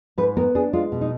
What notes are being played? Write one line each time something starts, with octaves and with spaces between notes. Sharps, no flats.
G#2 B4
B3 A#4
D4 G#4
G#3 F4
B2
D#4